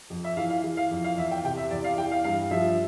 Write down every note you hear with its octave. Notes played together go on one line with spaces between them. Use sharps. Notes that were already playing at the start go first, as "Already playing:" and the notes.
F2
E5
E3 F5
F5
E3
F5
F2
F5
E2 E5
G5
C3 G5
E5
E2 D5
F5
E3 G5
F5
G2 F5
F3 E5